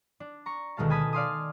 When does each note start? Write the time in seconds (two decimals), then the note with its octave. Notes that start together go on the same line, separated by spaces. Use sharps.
0.20 D4
0.46 A#5 C#6
0.77 D2 B2 D#3 G#3 F5 A5
0.90 G#5 A5 B5 D#6 A6
1.13 D5 F5 C6 D#6